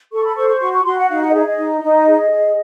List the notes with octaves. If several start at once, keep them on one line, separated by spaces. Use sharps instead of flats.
A4 C#6
B5
C5 C#6
C#6
F#4 C#6
C#6
F#4 C6
F#5
D#4 F5
F#5
D#5
G#4 E5
D#5
D#4
D#4
G#4
G#4